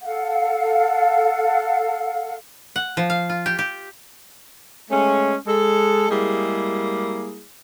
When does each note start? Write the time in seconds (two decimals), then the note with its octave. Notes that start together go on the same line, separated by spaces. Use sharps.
0.01 A4 F5 F#5
2.76 F#5
2.97 F3
3.10 F5
3.29 F4
3.46 G4
3.59 G4
4.91 G#3 A3 C#4
5.47 G#3 A4
6.10 G3 G#3 A#3 E4 G#4